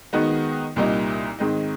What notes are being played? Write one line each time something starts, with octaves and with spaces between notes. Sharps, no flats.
D#3 G#3 B3 D#4 F#4
C2 A#2 G3 A#3 D#4
G#2 D#3 G#3 C4 D#4